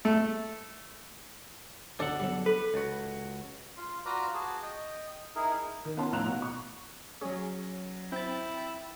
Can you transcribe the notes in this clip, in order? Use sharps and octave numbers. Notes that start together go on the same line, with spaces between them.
A3
D2 D4 A4 F#5
B1 G3
A4 B4
C#2 F#4
F4
F4 F#4 B4 D5 F5 A#5
F#4 G#4 A5
D#5 G5
D#4 E4 G#4 A#4
D#3
B3 C#4 F4 A5 C6
F2 A2 F5 A#5 F#6 F7
B2 F#4
C#6
F#3 C#4 G#4 C#5
C4 E4 G5 A6